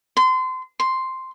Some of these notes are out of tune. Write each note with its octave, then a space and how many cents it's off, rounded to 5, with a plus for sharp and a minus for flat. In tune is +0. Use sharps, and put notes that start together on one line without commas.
C6 -30
C6 +0